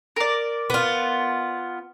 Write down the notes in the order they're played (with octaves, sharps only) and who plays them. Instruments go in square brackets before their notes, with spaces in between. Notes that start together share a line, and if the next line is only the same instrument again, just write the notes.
[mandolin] A#4 D5
[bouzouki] B3 F4